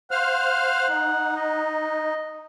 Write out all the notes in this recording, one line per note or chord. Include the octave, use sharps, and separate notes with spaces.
C5 F5 F#5 F6
D#4
D#5